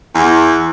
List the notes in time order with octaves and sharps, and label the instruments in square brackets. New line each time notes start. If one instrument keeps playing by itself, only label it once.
[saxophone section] E2